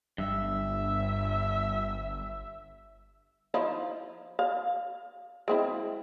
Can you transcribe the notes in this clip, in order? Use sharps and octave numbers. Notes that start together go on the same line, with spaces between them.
G1 G2 E5
F3 D#4 E4
F5
G#3 C4 E4